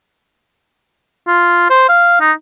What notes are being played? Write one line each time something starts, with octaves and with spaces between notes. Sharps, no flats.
F4
C5
F5
D#4